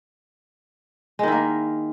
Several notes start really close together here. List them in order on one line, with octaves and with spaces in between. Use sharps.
G#3 D#3 E4 A#3